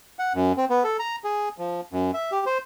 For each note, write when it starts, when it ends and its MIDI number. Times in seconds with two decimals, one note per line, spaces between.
0.19 0.33 78
0.35 0.52 42
0.57 0.65 60
0.70 0.83 59
0.84 0.97 69
0.99 1.16 82
1.24 1.49 68
1.58 1.81 53
1.92 2.11 42
2.14 2.31 76
2.32 2.44 67
2.46 2.58 72